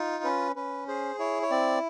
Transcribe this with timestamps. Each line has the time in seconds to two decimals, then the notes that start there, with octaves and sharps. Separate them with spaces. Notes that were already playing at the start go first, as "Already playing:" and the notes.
Already playing: D#4 F4
0.24 C#4 B4
0.56 C#4 B4
0.88 G#4 C5
1.19 E4 C#5
1.42 C#5
1.51 C4 D5